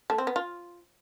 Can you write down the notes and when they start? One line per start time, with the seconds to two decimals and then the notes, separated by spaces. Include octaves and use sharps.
0.10 A3
0.18 C4
0.27 B3
0.36 F4